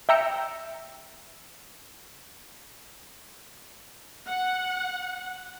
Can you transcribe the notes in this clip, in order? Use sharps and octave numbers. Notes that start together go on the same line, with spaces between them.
E5 G5 A#5 E6 C#7 D7
F#5